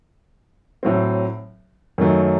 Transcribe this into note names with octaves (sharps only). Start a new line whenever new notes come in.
A2 F#3 C4
F#2 D#3 F#3 A3